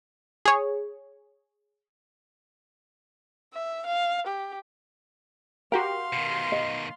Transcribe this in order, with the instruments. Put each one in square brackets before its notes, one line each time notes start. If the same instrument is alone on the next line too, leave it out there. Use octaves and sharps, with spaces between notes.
[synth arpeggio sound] G#4 C#5
[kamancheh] E5
F5
G4
[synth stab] F#4 G4 A#4 [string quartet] F5 C6 [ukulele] F#5
[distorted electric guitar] B2 D#3
[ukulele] D#5